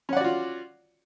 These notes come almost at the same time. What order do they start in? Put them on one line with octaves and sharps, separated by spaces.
C#4 F#5 D5 F#4 F4